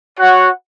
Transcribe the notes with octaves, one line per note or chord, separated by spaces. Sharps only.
F#4 C#5 F#5